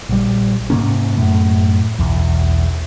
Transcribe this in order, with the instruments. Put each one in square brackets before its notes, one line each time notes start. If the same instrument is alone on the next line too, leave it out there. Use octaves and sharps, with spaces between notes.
[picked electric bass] A#1 G3
G#2 C3 A#3 C#4
F#2 A2 A3
B1 E2